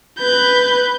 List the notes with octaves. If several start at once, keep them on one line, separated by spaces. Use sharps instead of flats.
B4 G6